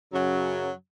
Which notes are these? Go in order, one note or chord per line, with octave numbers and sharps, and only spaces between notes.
F#2 C#3 F#3